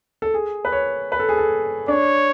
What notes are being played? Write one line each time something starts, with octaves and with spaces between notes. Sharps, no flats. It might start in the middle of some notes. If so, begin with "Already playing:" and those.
A4
G#4
B4
C#5
B4
A4
G#4
A4
D4 C#5